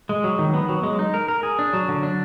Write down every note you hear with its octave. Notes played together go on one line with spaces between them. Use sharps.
G#3
F#3
D#3
B3
F#3
G#3
D#4
A#4
A#4
G#4
D4
F#3
D3
D4